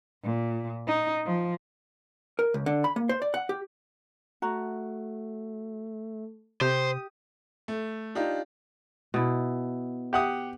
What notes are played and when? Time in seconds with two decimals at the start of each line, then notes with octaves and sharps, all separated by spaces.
0.24 A#2
0.87 D#4
1.25 F3
2.39 A#4
2.54 C#2
2.66 D3
2.84 B5
2.96 A#3
3.09 C5
3.22 D5
3.34 F#5
3.49 G4
4.42 A3 F#4 A#5
6.61 C3 G4 C5 D#6
7.68 A3
8.15 D4 D#4 F4 G4
9.14 B2 E4
10.13 G4 F#5 D#6